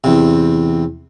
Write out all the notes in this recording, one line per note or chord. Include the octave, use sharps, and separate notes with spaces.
E2 C3